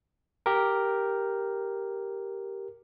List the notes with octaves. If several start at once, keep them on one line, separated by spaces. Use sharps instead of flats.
G4 A#4